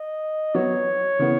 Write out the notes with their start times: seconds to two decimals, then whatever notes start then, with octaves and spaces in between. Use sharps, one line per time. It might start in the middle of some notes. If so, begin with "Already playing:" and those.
Already playing: D#5
0.54 F#3 B3 F#4 C#5
1.19 C#3 E3 B3